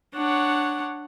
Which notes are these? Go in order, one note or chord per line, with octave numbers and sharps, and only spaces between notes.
D4 C#5 F#5